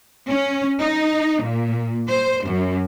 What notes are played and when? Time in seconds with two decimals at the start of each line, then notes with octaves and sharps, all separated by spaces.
0.28 C#4
0.80 D#4
1.41 A#2
2.08 C5
2.47 F#2